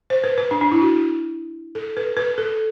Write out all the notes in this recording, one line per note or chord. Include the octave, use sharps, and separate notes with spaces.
C5
B4
B4
D4
D4
E4
F#4
A4
B4
B4
A4